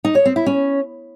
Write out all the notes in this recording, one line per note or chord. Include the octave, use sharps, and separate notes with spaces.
D#4
C#5
C4
E4
C#4